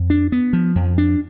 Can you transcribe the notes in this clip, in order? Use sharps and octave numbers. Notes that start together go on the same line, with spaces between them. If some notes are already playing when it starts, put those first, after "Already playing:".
Already playing: F2
D4
B3
F3
F2
D4